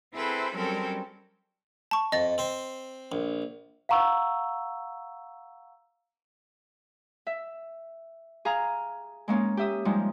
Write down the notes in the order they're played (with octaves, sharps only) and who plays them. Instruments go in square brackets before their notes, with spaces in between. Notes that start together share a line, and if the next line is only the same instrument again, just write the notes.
[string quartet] C4 E4 G#4 A4 B4 C5
F#3 G3 C4 C#4 A4 A#4
[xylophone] A5 C#6
[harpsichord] F2 [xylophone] D#5 A6
[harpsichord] C4 C5
A#1
[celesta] F5 F#5 A#5 C#6 E6
[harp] E5
G#4 F5 A#5
G#3 A#3 C#4 D#4
G4 E5 D#6
F3 G3 G#3 D#4